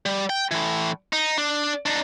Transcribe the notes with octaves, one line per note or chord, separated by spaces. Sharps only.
G3
G5
A2 E3
D#4
D4
D4 D#4